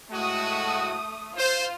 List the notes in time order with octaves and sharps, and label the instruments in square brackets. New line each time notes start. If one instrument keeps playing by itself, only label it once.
[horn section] A2 G#3 F#4 [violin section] A3 D#6
[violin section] F4 [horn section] C5